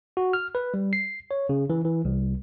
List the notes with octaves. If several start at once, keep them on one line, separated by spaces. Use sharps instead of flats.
F#4
F6
B4
G3
C7
C#5
C#3
E3
E3
C2